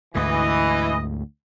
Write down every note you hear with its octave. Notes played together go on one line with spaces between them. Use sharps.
D2 G#2 D3 E3 D#5